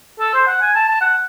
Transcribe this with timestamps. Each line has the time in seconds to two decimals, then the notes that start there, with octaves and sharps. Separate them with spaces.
0.20 A4
0.34 C5
0.47 F#5
0.62 G#5
0.75 A5
0.88 A5
1.01 F#5